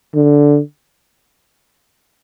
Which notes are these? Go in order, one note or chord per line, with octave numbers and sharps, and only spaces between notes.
D3